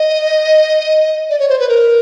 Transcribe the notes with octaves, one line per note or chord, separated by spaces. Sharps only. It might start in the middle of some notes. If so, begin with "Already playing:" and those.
Already playing: D#5
D5
C#5
C5
B4
A#4